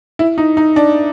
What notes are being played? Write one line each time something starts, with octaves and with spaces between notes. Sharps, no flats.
E4
D#4
D#4
D4